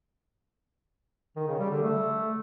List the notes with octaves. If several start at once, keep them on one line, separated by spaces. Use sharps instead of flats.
D#3
C#3
G3
D3
A3